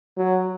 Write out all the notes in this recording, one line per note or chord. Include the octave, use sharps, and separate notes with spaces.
F#3